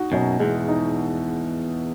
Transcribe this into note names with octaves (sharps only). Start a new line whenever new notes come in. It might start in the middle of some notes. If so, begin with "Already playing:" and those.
Already playing: D#4 F#4
F#2 B2
E2 G#3
D#4